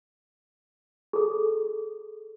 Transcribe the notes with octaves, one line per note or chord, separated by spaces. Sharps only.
G#4 A4